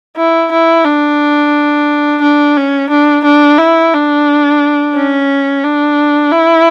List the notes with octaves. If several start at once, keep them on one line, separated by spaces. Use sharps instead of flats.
E4
E4
D4
D4
C#4
D4
D4
E4
D4
C#4
D4
E4